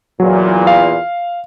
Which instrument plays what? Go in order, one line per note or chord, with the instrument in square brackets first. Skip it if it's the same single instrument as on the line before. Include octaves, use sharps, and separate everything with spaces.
[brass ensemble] E2 A#2 [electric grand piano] F#3
[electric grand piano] F5